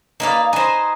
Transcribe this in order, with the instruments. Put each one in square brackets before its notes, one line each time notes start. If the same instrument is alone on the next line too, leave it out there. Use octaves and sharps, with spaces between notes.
[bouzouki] A#3 B4 F5 [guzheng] D#4 G#4 D5
[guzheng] D#4 B4 D#5 [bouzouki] C5 G#5